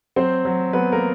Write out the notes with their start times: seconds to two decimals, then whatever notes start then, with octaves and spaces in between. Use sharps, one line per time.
0.16 F#3 C4 C5
0.45 F#3
0.73 F#3 B3 B4
0.92 A#3 A#4